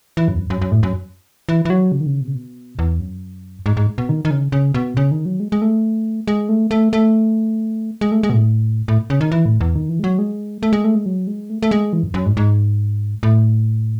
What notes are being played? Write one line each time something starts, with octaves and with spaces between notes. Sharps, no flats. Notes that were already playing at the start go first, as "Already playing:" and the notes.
E3
F#2
E2
F#2
F#2
F#2
A2
F#2
E3
E3
F#3
C#3
D#3
C#3
B2
C#3
B2
E2
F#2
G#2
G#2
B2
D#3
D#3
C#3
C#3
B2
C#3
D#3
F#3
G#3
G#3
A3
G#3
A3
A3
A3
G#3
A3
G#3
B2
A2
A2
C#3
D#3
E3
A2
E2
D#3
E3
G#3
F#3
G#3
A3
G#3
A3
G#3
F#3
G#3
A3
A3
G#3
E3
F#2
F#2
G#2
G#2
A2